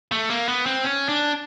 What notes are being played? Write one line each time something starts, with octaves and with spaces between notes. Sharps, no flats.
A3
A#3
B3
C4
C#4
D4